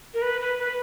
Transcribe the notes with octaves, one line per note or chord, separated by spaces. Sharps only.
A#4
B4
B4
B4